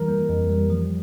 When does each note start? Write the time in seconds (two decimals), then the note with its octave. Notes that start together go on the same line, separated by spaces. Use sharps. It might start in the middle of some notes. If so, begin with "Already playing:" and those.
Already playing: E3 G3 A#4
0.08 A#3
0.29 F2
0.50 G3
0.70 F3